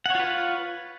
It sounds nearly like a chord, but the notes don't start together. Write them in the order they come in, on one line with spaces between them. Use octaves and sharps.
F#5 C#5 F4 B4